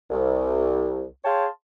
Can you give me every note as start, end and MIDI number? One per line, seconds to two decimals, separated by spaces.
0.10 1.04 36
1.24 1.47 68
1.24 1.47 73
1.24 1.47 77
1.24 1.47 79
1.24 1.47 81
1.24 1.47 84